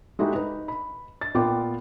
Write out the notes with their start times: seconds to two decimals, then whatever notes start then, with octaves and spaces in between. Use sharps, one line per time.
0.19 G#3 D#4 E4 F#4 G4 A4
0.33 D#4 B4
0.68 B5
1.21 A6
1.34 A#2 B3 F4 G5 D6